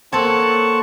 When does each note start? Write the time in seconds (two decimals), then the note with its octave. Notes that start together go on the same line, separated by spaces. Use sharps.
0.13 A#3 C4 A4 C#5 F#5 A5 C#6